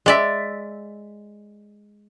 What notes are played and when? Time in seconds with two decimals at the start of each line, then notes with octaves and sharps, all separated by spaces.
0.06 G#3 D5 E5